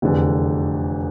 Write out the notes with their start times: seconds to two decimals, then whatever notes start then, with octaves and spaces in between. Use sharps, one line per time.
0.02 F1 E2 D3